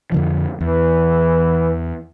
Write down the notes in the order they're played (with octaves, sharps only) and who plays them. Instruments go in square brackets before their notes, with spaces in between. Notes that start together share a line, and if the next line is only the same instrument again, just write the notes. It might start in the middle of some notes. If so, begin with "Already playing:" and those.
[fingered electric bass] F2 D3 F3
[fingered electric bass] E2 [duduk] E3